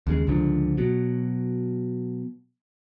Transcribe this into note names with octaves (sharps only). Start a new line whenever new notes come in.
D#2 C#3 F#3 G#3
C#2 G#2 D3 F3
B2 F#3